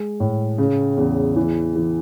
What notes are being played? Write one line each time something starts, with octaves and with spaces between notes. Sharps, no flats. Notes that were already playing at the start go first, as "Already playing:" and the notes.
Already playing: G#3
A2
C#3
E2
E3
E3